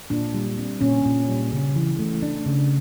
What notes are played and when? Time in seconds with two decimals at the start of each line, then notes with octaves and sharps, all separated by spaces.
0.10 A#2 D4
0.34 G3
0.58 C4
0.81 A#2 C#4
1.05 A#2
1.29 G3
1.52 C#3
1.76 E3
1.99 A3
2.22 D4
2.46 C#3